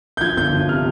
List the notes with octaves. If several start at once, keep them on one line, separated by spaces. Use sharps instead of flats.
G6
F3 G#6
G1 G6
F3
C3 F6